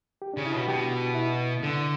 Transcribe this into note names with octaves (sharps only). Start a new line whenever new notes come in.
G4
D4
C#3
E4
B2
F#4
B2 G4
F#4
E4
D3